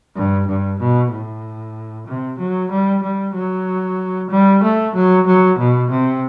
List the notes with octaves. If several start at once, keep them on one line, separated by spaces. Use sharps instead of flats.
G2
G2
B2
A2
C3
F#3
G3
G3
F#3
G3
A3
F#3
F#3
B2
C3